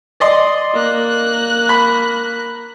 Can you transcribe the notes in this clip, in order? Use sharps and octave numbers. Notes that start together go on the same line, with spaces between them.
D5 D#5 C6
A#3 F#6
B5